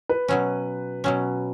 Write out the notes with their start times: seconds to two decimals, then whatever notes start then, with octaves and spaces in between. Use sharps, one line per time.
0.09 B4
0.28 B2 F#3 C#4
1.04 B2 F#3 C#4